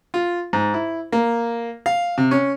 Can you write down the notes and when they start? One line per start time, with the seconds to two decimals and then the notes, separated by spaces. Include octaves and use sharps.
0.14 F4
0.53 G#2
0.74 E4
1.12 A#3
1.86 F5
2.18 C3
2.31 C#4